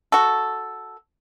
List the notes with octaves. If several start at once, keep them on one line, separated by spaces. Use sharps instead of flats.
F#4 A4